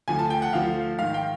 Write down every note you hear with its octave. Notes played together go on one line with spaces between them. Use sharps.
D2 D3 F3 G#5
A5
G5
F#5
D2 D3 F3 F5
G#2 D#3 F5
G5